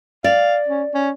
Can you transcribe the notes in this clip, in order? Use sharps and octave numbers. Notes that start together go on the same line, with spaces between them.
D5 F5
C#4
C#4